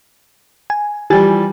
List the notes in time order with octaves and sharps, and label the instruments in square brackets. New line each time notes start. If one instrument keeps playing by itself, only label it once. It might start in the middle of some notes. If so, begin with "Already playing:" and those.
[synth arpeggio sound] G#5
[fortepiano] E3 F3 G3 [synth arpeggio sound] G4 G#5 A6